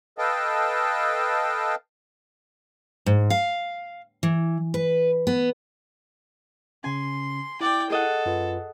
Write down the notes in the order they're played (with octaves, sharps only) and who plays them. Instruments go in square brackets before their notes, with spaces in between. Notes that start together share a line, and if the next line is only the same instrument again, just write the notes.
[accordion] A4 B4 D#5 F5 G5 A5
[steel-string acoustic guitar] G#2
F5
E3
B4
B3
[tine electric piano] C#3 C#4 [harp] G#5 [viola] C6
[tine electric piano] E4 [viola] D5 G5
[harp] G#4 D#5 F#5 [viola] A4
[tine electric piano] F#2 F4 B4